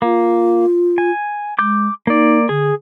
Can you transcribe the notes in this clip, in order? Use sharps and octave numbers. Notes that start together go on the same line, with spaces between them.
A#3 F4
G#5
G#3 D6 G6
A#3 D#4 D5
D3 G#4